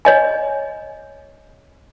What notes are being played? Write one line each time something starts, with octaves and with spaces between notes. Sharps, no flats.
C#5 D#5 G#5